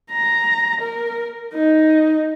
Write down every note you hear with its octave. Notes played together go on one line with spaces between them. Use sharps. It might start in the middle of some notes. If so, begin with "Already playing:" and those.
A#5
A#4
D#4